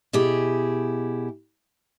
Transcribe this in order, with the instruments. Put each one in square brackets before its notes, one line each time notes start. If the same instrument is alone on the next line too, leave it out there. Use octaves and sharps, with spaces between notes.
[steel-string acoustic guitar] B2 E4 G4 G#4